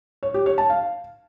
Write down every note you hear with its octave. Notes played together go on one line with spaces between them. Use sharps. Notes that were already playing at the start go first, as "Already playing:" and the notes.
C#5
G4
C#5
A5
F5